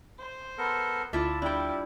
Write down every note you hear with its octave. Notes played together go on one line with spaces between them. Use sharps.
C5
B3 A4 A#4
D2 E4 F4 D5 E5 A5
G3 D4 E4 G5